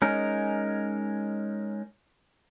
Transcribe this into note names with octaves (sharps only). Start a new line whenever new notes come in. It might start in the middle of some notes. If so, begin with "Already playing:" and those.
G#3 C#4 D#4 A#4